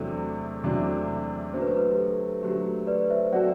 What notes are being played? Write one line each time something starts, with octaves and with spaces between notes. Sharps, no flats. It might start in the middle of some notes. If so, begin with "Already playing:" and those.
Already playing: E2 C3 F#3 A3 D4 A4
E2 C3 F#3 A3 D4
D3 F#3 A3 C5
B4
A4
B4
G4
A4
D3 F#3 A3 G4
B4 D5
C5 E5
F#3 C4 F#4 A4 D5 F#5